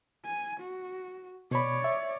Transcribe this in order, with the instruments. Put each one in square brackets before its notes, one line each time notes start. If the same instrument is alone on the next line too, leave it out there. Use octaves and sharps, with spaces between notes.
[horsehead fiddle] G#5
F#4
[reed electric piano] B2 B5 [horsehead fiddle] C#5 D5
[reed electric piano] E5